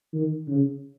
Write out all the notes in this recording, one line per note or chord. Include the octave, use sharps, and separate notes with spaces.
D#3
C#3